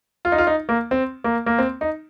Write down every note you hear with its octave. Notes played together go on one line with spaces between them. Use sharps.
F4
D#4
F4
D#4
A#3
C4
A#3
A#3
C4
D#4